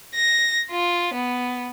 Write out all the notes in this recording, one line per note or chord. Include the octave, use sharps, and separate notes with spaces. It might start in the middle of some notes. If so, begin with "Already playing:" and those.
A#6
F4
B3